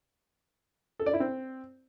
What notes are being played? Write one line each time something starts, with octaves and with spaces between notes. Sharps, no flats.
A4
D5
E4
C4